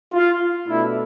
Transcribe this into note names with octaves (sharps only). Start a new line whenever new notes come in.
F4
B2 A3 D4 E4